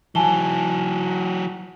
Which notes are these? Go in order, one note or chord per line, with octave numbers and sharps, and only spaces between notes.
E3 F#3 G#5 A5 G7